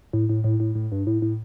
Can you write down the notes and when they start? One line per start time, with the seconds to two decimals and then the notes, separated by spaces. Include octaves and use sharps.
0.13 A2
0.29 A2
0.44 A2
0.60 A2
0.75 A2
0.92 G2
1.07 A2
1.22 A2